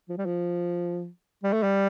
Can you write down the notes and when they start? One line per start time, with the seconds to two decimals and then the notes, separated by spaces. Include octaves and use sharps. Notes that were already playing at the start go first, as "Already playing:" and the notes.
0.09 F3
0.18 G3
0.26 F3
1.43 G3
1.53 A3
1.63 G3